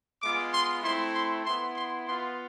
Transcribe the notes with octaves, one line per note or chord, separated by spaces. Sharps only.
G#3 B3 F4 D6
C6
A3 C4 E4 C6
C6
B3 E4 C6
C6
B3 F4 C6